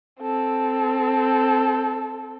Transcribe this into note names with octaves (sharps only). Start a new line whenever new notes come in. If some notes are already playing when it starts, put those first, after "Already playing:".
C4 A4